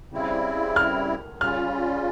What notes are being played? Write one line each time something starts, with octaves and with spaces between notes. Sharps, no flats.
C#3 G3 C4 E4
F6
C#3 G3 C#4 F4 F6